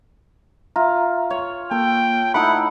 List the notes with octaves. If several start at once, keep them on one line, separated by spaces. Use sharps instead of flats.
F4 E5 A#5
C#5
A#3 A4 G5
A3 D#4 E4 F#5 B5